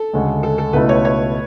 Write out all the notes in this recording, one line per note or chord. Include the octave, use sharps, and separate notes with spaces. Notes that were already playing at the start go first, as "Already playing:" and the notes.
Already playing: A4
D2 C#3 G#3
A4
A4
C#2 B2 A3 E4 B4
C#5
C#5